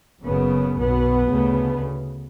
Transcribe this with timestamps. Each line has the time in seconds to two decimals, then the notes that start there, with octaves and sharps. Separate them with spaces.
0.22 F#1 F#2 C#3 B3
0.76 B1 B2 B3
1.30 D2 C#3